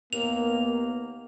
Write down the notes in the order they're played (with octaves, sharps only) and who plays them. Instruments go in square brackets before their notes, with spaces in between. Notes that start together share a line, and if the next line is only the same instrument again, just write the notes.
[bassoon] D#2 [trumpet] A#3 [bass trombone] B3 [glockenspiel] F7